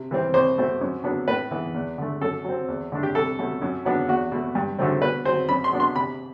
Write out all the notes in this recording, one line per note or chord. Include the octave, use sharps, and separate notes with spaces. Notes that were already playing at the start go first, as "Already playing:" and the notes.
Already playing: C3
E3 G3 C4
C2 C5
B2 A3 C4
F#2
F#3 B3 D4
A2 B4
E3 B3
E2
D3 A3
F#2 A4
F#3 C4
E2
D3 A3 D4
G4
C2 A4
B2 F#3 A3
F#2
F#3 B3 D4
E2 F#4
B2 A3
G2
D3 F#3 A3 C4
B2 B4
F#3 C4 C5
F#2 B5
C6
F#3 B3 D4
C6
C3 B5